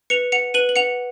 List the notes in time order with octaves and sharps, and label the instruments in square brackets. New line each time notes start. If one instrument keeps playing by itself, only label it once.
[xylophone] B4 C#7 F7
F#5 C#7 F7
B4 D#7 F#7
F#7
F#5 C#7 F7